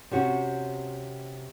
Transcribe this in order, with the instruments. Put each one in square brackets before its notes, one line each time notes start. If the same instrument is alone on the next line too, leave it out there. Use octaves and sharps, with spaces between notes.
[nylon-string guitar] C3 C4 C#4 F#4